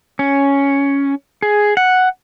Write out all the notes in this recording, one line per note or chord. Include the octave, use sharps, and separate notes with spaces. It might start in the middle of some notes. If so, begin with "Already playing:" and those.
C#4
G#4
F#5